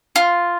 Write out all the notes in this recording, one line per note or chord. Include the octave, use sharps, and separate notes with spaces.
F4